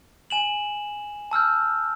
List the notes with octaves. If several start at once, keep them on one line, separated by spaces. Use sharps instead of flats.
G#5 E7 F#7
A5 E6 F6 G6